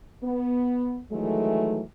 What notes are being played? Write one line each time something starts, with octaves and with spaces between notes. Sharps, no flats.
B3
D#3 E3 F#3 G#3 A3